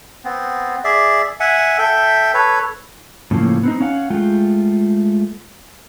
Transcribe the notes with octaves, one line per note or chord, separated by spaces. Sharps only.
B3 C4
G#4 D5 E5
E5 F#5 G#5
A4 E5 G5
A4 B4 C#5
A2 C#3 F3 A3 A#3
B3 C4 D#4
C#4 F5 F#5
G#3 A3 F4 G5